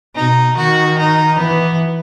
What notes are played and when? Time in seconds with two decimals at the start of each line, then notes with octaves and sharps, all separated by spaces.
0.15 B2 D#4
0.57 D#3 F#4
0.98 D#4
1.38 E3 B3